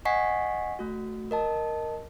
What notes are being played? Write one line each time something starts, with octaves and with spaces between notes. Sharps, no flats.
D#5 F#5 G#5 C#6 B6 C7
A3 F#4
A#4 D#5 A5